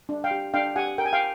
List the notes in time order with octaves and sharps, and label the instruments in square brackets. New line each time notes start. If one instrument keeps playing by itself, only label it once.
[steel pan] D4
F5 G5
G4
D4 F5 G5
G4 F#5 G#5
A#4 G5
G#5
F5 G5